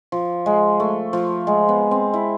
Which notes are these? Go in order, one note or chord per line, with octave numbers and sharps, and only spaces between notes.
F3
G#3
A3
F3
G#3
B3
C4
E4